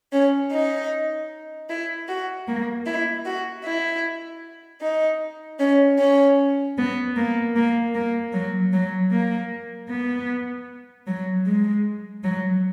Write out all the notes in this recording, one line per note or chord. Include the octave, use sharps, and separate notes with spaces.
C#4
D#4
E4
F#4
A#3
E4
F#4
E4
D#4
C#4
C#4
B3
A#3
A#3
A#3
F#3
F#3
A#3
B3
F#3
G#3
F#3